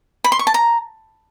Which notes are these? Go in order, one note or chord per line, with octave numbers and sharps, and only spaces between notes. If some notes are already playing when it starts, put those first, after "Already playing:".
B5
C6
C#6
A5
A#5